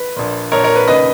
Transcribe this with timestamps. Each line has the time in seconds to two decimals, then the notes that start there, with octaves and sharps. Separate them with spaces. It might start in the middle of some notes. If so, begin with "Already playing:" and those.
Already playing: B4
0.16 A#1 A#2
0.52 A#1 A#2 A#4 C#5
0.64 A#4 C#5
0.76 B4
0.88 E1 D#2 C#3 B4 D#5